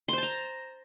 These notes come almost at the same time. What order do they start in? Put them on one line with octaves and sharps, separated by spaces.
C6 C5 A5 A#5